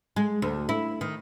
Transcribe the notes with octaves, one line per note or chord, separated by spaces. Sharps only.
G#3
D2
E4
D#3